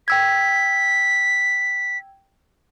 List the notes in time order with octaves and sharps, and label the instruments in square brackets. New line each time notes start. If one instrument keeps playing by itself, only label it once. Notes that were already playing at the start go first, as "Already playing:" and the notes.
[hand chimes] G5 E6 G#6 [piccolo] B6